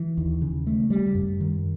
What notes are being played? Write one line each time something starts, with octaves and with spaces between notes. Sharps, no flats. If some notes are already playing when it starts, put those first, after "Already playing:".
Already playing: E3
D#2
C#3
A3
G3
F#2
D#3